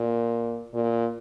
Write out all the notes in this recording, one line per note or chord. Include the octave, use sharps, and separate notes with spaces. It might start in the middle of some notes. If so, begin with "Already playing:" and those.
Already playing: A#2
A#2